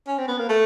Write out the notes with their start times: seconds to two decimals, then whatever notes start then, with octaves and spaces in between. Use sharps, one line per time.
0.07 C#4
0.18 C4
0.28 B3
0.38 A#3
0.49 A3